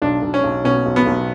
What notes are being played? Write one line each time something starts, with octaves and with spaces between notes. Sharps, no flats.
B1 D4
B1
C#4
B1
B2 C#4
B1
B3
B1